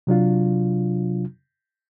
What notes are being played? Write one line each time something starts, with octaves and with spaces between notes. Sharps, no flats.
C3 F#3 D4 F4